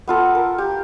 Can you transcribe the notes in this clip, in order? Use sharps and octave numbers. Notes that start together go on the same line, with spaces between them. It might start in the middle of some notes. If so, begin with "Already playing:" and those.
B3 F4 A4
A#4
G4